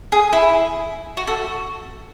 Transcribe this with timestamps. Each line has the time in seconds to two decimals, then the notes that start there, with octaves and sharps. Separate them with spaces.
0.12 G#4
0.33 E4
1.17 F#4
1.27 F#4 A4